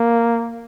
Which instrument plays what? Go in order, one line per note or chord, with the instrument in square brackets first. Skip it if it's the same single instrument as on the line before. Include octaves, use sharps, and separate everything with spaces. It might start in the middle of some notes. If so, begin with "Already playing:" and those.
Already playing: [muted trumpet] A#3